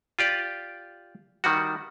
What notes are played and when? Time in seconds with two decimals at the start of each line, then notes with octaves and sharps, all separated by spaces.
0.19 F4 G4 D5
1.44 D#3 G3 F#4